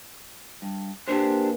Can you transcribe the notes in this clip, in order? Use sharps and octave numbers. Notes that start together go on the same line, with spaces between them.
G2
A#2 D4 G4 B4 C5 G#5